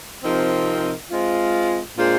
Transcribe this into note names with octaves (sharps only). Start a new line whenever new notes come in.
C3 F3 C4 D#4 A#4
G#3 C4 F4
A#2 G#3 D4 F4 C5